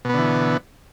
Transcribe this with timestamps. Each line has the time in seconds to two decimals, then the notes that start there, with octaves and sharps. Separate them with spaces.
0.05 B2
0.09 B3
0.14 D3
0.18 E3